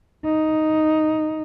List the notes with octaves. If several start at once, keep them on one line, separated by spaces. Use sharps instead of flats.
D#4